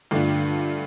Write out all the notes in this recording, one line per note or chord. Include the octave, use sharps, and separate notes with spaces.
G2 D3 A3 D4 F4